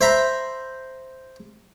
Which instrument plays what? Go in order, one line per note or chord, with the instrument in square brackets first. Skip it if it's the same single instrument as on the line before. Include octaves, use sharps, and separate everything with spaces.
[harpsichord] C5 E5 A#5 B5